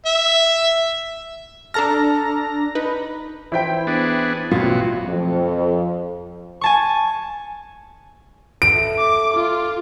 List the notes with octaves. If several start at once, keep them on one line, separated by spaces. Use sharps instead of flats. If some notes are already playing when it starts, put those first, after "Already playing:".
E5
D4 A4 A5 A#5 F6 A#6
D#4 B4
E3 E4 C5 G5 B6
B3 D4 G#4
A1 B2 F#3 F4
F2
G#5 A5 C#6
D3 E5 D7
D6
F4